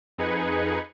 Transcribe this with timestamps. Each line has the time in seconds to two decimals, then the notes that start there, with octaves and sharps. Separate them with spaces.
0.18 F2 D#4 G#4 B4 G#6 C#7